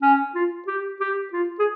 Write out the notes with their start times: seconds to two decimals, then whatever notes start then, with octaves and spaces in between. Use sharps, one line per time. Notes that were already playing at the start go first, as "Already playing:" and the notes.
0.02 C#4
0.35 F4
0.67 G4
1.00 G4
1.33 F4
1.59 G#4